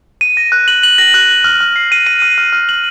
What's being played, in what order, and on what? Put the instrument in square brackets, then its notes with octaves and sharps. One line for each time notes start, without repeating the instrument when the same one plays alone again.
[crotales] D#7
A#6
F#6
F#7
F#7
A#6
F#6
F#7
F6
F6
C7
D#7
D#7
F6
F6
F6
F#7